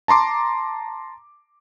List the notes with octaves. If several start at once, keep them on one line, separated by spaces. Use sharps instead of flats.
A5 A#5 C6 D6